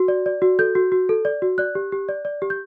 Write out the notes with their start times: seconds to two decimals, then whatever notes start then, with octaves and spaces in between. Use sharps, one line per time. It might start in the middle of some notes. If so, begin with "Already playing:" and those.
Already playing: F#4
0.08 D5
0.26 D5
0.42 F#4
0.59 A4 G6
0.75 F#4
0.92 F#4
1.09 A4
1.25 D5
1.42 F#4
1.58 D5 F#6
1.75 G4
1.92 G4
2.09 D5
2.25 D5
2.42 G4
2.50 G6